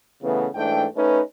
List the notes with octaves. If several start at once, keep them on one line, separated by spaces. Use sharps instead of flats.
C#3 E3 A3 B3
G#2 E3 A3 D4 G5
A3 C#4 D#4 B4